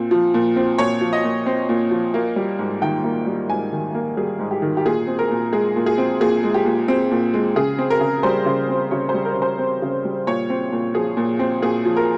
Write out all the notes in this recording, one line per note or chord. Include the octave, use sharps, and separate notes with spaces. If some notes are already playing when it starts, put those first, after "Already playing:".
Already playing: A#2 C4
F3
A#2
C4
A#2 C#5
F3
D#5
A#2
C4
A#2
F3
A#3
G3
G#2
D#3 G5
A#3
G3
G#2 G#5
D#3
A#3
G3 G#4
G#2
G4
D#3
G4
A#2 G#4
C4
A#4
A#2
G#3 G#4
A#2
G#4
C4
A#2 G#4
G#3
G4
A#2
C4
A#2
G#3
C#3 G#4
C4
A#4
C#3
G3 C5
C#3
C4
C#3 C#5
C5
G3
A#4
C#3
C5
C4
C#3
G3
A#2 C#5
C4
A#2
F3 G#4
A#2
C4
A#2 G#4
F3
A#4